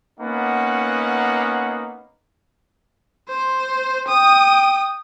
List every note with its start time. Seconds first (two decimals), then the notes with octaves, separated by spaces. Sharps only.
0.20 A#3 B3 C#4 D#4 F#5
3.29 C5
4.08 G5 D#6